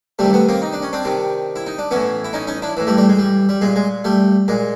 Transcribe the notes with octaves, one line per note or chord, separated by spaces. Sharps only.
C3 D#3 G3 A3
A3 B3
A#3 C4
D#4
D4
C#4
C4 D4
C3 D#3
E4
D#4
D4
A2 E3 B3 C#4
E4
C#4 D#4
C#4 D#4
D4 E4
A2 E3
G3 A3
G3 A3
G#3
G3
G3
A#2 G#3
G#3
G3 A3
A#2 G#3